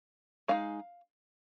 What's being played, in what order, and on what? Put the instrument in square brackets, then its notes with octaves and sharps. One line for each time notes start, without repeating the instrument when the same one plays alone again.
[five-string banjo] G#3 D#4 F5